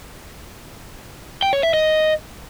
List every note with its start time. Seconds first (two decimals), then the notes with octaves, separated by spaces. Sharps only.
1.42 G5
1.53 C#5
1.63 E5
1.74 D#5